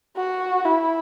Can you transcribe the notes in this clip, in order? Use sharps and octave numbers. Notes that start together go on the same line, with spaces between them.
F#4
E4